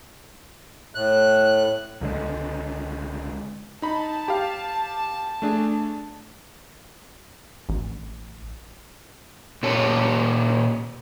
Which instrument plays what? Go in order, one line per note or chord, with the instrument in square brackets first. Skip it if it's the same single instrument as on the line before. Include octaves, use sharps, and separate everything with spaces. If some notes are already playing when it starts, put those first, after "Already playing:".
[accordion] A2 F#6
[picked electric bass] C#2 D3 G#3
[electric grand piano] D#4 B5 [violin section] A5
[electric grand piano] G4 F5
A3 D4 G#4
[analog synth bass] A1
[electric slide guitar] A#2 A#3 G4 C#5 A5